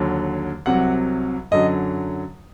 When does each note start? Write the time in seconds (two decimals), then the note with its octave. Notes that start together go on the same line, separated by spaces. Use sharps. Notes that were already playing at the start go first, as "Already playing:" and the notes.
Already playing: D#2 D3 F#3
0.66 C2 C3 F#3 F#5
1.51 F#2 D3 F#3 D#5